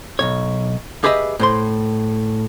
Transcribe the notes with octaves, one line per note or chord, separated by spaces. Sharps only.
B1 G2 C#5
G4 G#4 B4 D#5 E5
A2 C5 C6